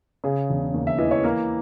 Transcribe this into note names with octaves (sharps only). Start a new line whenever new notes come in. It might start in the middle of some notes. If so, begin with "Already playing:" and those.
C#3 G#4
E1
D#2
E5
E3 D#5
C#5
A#3 A#4